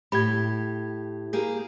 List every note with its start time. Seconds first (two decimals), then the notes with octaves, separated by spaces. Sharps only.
0.12 A2 G4 B5 G#6
1.33 A#3 G4 G#4